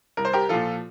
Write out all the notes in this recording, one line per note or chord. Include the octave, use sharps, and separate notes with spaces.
C2 A#4
C5
G4 A#4
A#2 F3 F4 A4